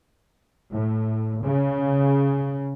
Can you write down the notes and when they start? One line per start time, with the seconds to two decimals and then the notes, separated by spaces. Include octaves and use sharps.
0.71 A2
1.40 C#3